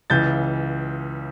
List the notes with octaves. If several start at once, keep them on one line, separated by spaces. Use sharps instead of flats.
C#2 C#3 E3 G6 A6